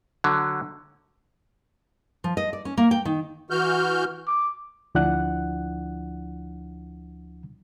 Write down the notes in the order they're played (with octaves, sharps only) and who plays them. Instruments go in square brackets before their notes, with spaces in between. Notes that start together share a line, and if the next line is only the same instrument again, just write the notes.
[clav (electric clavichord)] D3 F#3
[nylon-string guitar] F3
D#5
D5
C#4
A#3
G5
D#3
[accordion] E3 F#4 F6 G6
[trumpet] D6
[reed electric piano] D2 F3 D4 E4 F#5 F#6